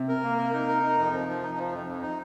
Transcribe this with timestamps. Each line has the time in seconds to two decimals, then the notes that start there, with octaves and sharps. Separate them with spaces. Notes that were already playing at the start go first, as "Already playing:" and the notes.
Already playing: C3
0.08 A#4
0.23 A#3
0.38 A#4
0.53 D#4
0.68 A#4
0.83 D#4
0.98 F2
1.12 F3
1.28 F3
1.43 D#4
1.58 F3
1.72 F2
1.87 F2
2.02 D#4